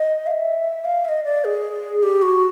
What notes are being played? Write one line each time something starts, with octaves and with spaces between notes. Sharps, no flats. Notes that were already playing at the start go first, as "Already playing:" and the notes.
Already playing: D#5
F5
E5
F5
E5
D#5
D5
G#4
G4
F#4